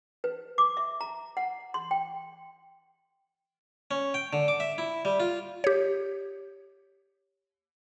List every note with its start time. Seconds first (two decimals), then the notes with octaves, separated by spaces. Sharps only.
0.24 B4
0.58 D6
0.77 E5
1.01 A#5
1.37 F#5
1.74 C6
1.91 G5
3.91 C#4
4.14 G5
4.33 D3
4.48 D6
4.60 E5
4.78 E4
5.05 G3
5.20 F4
5.64 G4 C#5